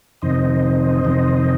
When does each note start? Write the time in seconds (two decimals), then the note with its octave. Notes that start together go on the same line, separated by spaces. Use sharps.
0.22 F2 C3 D#3 C5 D#5
1.05 F2 C3 D#3